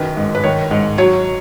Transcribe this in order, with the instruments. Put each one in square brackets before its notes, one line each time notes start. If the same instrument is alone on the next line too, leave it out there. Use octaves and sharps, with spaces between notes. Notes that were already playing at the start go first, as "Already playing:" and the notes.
Already playing: [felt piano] F#2 D#3 B4
G#2
B4
D#3 C#5
G#2
F#3 C#5